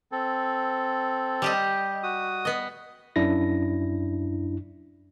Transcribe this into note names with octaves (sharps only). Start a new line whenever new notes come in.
C4 A4
G3 G4 D#5
F#4 D#6
B3 D#5
F#2 D4 E4 A#6